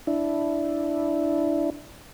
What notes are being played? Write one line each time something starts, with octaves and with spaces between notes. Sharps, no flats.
D4 E4